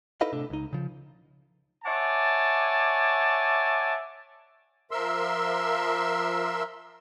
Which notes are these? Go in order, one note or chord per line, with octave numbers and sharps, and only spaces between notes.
D#4 E4 A4 B4 D#5 F5
A2 C3 D4 A4
C#2 D#4
C#3 F3
C#5 D5 E5 F#5 G#5 A5
F3 A#4 E5 C6 E6